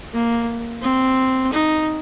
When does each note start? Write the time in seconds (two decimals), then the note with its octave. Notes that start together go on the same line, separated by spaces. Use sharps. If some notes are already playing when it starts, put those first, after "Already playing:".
0.13 A#3
0.83 C4
1.53 D#4